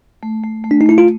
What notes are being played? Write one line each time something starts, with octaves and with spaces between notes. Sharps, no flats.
A3
A3
A3
D4
D#4
A3 E4
F4